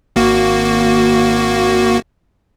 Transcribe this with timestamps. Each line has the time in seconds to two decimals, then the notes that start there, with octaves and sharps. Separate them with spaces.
0.16 G#1 A#3 F#4